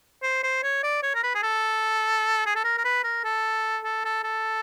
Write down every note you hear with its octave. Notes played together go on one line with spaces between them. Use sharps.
C5
C5
C#5
D5
C#5
A#4
B4
G#4
A4
G#4
A4
A#4
A#4
B4
A#4
A4
A4
A4
A4